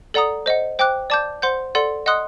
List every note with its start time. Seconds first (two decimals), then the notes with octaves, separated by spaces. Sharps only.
0.14 A4 D5 F#5 A#5 D#6
0.46 C5 D#5 F#5
0.79 C5 G5 D6 F#6
1.10 D5 A5 D6 G6
1.42 C5 F#5 C6 G6
1.75 A4 D5 F#5 C6
2.06 D#5 F#5 C6 D#6 F#6